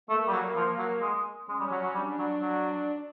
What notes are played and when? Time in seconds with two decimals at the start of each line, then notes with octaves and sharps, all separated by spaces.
0.09 A3 A#3
0.27 G3
0.32 F#3
0.56 F3
0.78 F#3
1.01 G#3
1.48 G#3 C#4
1.60 G3
1.71 F#3
1.84 F#3
1.94 G3 D4
2.18 F#3
2.41 F#3